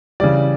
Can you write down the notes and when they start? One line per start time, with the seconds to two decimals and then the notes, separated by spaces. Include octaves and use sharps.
0.20 C#3 E3 G3 D5